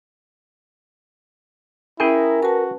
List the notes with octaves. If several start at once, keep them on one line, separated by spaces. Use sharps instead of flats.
C#4 E4 G#4 A#4 G5
F#4 B4 A5